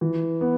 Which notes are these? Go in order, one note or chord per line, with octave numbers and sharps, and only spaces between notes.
E3
B3